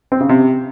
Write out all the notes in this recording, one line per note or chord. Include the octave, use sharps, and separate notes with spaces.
C4
C#3
C3